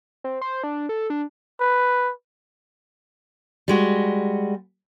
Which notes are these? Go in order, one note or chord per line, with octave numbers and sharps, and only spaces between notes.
C4
C5
D4
A4
D4
B4
G3 G#3 F#4